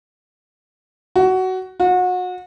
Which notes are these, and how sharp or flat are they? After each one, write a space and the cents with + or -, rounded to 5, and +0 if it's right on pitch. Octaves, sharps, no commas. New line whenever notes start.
F#4 +15
F#4 -30